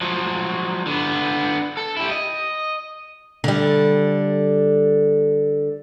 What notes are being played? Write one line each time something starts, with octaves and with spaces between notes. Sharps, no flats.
F3 F#3
D3 B3
A4
E4 G4
D#5
D3 G3